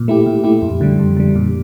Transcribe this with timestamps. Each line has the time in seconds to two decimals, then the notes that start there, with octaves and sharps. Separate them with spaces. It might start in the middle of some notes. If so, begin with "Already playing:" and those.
Already playing: A#2
0.08 A3 E4 G4
0.26 A#2
0.44 A3 E4 G4
0.62 F2
0.81 D3 G3
0.99 F2
1.17 D3 G3
1.36 A#2